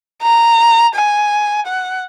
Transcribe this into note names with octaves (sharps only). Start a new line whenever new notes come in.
A#5
G#5
F#5